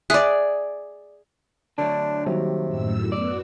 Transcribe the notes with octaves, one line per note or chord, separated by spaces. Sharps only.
G#4 D5 E5 D#6 F#6
D3 F#3 A3 D4
D#2 G#2 C3 D#3 F#3 G3
F#2 A2 E6
B3 F#4 D5